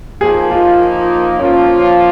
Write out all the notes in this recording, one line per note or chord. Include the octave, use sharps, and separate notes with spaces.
F3 A#3 D#4 G#4
F4
F3 A#3 C#4 F4